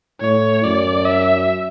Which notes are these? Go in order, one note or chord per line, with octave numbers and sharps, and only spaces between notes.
A2 C#5
F#2 D5
E5